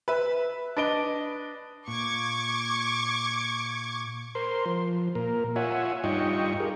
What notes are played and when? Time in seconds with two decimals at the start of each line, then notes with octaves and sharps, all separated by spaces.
0.08 B4 E5
0.77 D4 B4 D#5 D7 G7
1.88 A#2 C#6 D6 G#6
4.35 A#4 C5 C6
4.66 F3
5.15 A#2 A#4
5.56 F4 C#5 E5 F#5 G#5
6.04 G2 D#4 F4 D#5 G5 C#6
6.60 G4 G#4 A#4